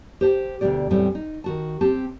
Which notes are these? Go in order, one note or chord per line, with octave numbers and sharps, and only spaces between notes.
G4 C5 A5
D2 B2 D#3 F#3 G4 D5
E2 A2 G3 A3 C4 C#4
D#4
D#3 F#4 A5
C4 G4 A5